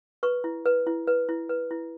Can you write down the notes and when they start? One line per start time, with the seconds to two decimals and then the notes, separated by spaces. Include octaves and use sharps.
0.23 B4 C#6
0.44 E4
0.66 B4
0.87 E4
1.07 B4
1.29 E4
1.49 B4
1.71 E4